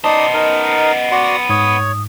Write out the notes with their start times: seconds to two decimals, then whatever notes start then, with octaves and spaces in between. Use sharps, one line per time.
0.04 B3 D#4 C5 D5 D#5 A5 D#6
0.34 D#4 A#4
1.12 F#4 D5 F#5 C6
1.49 G#2 C#5 D#6